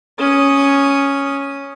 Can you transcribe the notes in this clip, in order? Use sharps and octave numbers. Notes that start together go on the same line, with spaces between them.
C#4 D#6